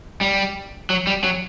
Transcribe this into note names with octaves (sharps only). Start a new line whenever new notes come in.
G3
F#3
G3
F#3